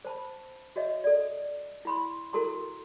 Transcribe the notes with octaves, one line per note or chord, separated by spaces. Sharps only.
C5 A5 B5
F#4 C#5 D#5 E5
A4 D5
E4 B5 C6
E4 F#4 A4 A#4 A#5 C6